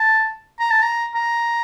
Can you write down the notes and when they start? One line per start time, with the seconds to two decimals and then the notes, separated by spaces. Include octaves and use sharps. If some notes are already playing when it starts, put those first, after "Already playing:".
Already playing: A5
0.59 A#5
0.71 A5
0.83 A#5
1.15 A#5